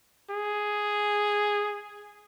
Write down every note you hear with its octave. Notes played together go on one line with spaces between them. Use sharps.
G#4